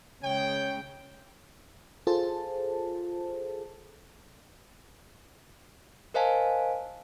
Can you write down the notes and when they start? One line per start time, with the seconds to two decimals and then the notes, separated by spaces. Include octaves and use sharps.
0.23 C#3 G#3 C#5 G5
2.07 F4 G#4 A4 C5 A5
6.14 A#4 C5 D#5 F5 G#5 A5